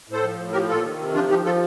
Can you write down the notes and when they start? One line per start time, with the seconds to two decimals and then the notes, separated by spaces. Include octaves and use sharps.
0.08 A2 A4 C5
0.23 F3
0.38 A2
0.53 F3 G4 A#4
0.68 A#2 F4 A4
0.83 D#3
0.98 C3
1.14 F3 D4 F4
1.29 F3 D#4 G4
1.45 F3 F4 A4